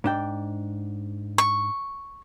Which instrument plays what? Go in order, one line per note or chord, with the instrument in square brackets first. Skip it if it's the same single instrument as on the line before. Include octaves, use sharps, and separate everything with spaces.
[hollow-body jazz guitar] G#2 D4 G5
[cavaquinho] C#6